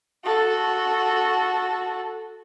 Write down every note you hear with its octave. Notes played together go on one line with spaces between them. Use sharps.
F#4 A4